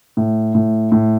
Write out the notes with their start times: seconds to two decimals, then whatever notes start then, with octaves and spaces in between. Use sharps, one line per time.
0.17 A2
0.55 A2
0.92 A2